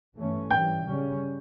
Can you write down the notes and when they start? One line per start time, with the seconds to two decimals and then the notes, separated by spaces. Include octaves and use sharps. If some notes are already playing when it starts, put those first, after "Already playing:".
0.16 G2 E3 A3 C#4
0.51 G2 E3 G3 G5 G6
0.87 C#3 G3 C#4